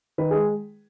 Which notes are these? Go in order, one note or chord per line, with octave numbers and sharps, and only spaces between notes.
D#3 B4
G#3 G#4